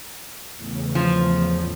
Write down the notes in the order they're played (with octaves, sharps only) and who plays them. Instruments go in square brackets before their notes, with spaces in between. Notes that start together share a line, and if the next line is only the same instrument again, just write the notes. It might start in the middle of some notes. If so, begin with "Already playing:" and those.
[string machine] E2 A2 C#3
[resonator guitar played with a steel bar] F3